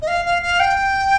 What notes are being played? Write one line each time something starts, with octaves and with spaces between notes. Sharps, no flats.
D#5
F5
F5
F5
G5